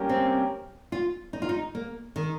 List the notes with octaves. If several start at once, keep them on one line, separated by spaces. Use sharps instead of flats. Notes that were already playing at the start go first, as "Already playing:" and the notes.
Already playing: G3 A#3 C#4 G4 A#4
C4
F4
D#4
F4
D#4
A#3
D#3